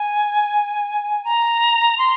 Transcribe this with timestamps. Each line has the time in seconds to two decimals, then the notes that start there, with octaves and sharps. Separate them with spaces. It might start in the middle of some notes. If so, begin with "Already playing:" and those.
Already playing: G#5
1.24 A#5
1.98 C6